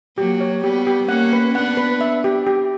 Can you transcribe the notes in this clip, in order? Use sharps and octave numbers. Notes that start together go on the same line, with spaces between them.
F#3 A#3 G4
C#5
G3 B3 G4
G4
A#3 C#4 F#5
B4
B3 D4 F#5
B4
E5
G4
G4